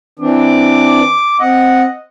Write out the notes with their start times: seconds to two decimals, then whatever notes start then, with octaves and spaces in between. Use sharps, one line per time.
0.19 E3 C4 D4 D6
1.40 C4 D#5 F#5